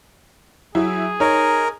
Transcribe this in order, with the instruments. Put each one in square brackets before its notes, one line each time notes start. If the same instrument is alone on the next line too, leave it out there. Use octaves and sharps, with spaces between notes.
[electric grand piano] F#3 [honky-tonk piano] E4 [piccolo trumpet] G#4
[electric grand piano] D#4 [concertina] A#4 [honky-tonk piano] C#5